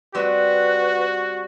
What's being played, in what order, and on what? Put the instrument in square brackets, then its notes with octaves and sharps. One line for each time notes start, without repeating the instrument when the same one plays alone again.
[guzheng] G3 C4 E5 [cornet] F#4 [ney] B4